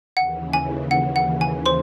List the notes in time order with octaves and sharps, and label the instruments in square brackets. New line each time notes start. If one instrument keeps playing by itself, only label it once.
[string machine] D#2 C#3 E3 [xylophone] F#5
[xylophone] G#5
F#5
F#5
G#5
C5 C6